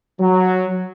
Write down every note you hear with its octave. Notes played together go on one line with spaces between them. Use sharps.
F#3